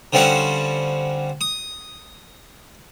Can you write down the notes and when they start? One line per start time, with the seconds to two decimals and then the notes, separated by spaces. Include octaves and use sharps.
0.13 D3 F3 G3 C4 C#4 F#4
1.41 D#6